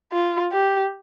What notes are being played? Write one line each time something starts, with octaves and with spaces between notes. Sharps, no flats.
F4
G4